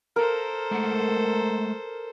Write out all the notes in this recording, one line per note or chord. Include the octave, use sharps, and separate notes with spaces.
A4 A#4 C5
G#3 A3 F#5